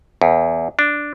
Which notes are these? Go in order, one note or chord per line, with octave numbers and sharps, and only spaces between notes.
E2
D4